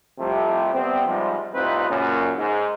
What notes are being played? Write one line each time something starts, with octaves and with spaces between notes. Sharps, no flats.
C2 F2 C3 F3 G3 A3
C3 G3 B3 C4
G#2 C3 F3 G3
C2 A2 C4 D#4 F4 B4
F#2 A#2 C#3
G#2